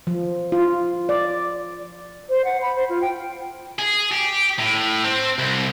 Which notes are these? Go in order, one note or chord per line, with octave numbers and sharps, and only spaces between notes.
F3
F4
D5
C5
F#5
B5
C5
F4
G5
G#4
G4
A2
C4
C2